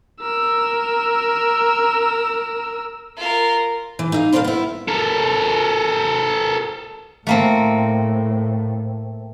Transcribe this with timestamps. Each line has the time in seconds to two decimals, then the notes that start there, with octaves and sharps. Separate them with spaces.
0.21 A#4 E6
3.17 F4 A#4
3.99 E3
4.12 D#4 E5 F5
4.33 B2 C4 D4 G#4 A4 F5
4.44 B3 E4
4.88 A4 A#4
7.27 A2 A3 A#3 C4